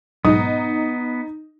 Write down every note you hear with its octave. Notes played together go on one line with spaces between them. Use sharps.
B1 G#2 B3 D#4 D#6